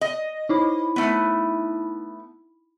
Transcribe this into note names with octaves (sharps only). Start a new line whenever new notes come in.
D#5
D#4 E4 B5
A3 B3